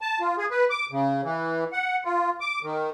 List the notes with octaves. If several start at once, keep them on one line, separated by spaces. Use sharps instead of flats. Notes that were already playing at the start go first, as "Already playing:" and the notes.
A5
F4
G#4
B4
D6
C#3
E3
F#5
F4
D6
D#3